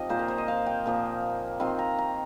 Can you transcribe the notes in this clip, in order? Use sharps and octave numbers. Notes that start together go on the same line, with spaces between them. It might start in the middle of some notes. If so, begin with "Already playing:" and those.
Already playing: F3 C4 D#4 G4 D#5
A#2 A#3 F4 C5
A#4
C5
D#5
F5
G5
A#2 F3 A#3
D#3 C4 F4 C6
A#5
A#5